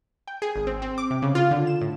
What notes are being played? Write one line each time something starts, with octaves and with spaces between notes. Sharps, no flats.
G5
G#4
G#1
C4
C4
D6
C3
C#3
F4
D3
E7
A2